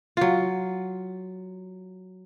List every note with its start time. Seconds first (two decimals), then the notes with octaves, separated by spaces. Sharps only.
0.17 F#3 F4